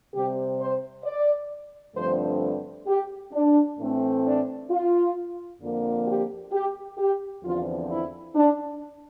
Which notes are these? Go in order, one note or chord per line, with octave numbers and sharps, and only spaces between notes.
C3 G3 C4 G4
C5
D5
G2 D3 F3 A3 C4 C5
G4
D4
A2 E3 A3 C4
D4
F4
F2 D3 F3 A#3
G4
G4
G4
E2 D3 F3 C4 F4
E4
D4